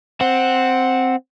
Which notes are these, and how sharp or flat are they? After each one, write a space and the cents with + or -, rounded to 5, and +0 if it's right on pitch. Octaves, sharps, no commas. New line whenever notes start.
C4 +0 F#5 -5